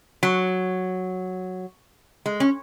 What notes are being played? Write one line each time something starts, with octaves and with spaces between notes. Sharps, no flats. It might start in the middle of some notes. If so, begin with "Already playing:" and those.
F#3
G#3
C#4